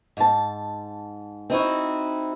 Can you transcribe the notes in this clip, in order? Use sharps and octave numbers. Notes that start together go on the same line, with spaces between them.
G#2 A5
C4 D#4 E4 F#4